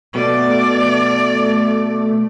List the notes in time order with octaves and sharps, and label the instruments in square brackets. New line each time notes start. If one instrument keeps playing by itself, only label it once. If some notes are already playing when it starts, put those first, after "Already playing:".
[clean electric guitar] B2 [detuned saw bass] A3 [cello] D5